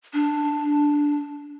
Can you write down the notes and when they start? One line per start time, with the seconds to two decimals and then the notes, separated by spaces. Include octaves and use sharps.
0.13 D4